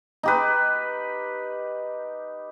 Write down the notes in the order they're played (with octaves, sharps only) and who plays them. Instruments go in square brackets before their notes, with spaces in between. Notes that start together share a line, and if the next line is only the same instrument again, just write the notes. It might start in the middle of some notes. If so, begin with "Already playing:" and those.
[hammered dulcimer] D#4 G4 B4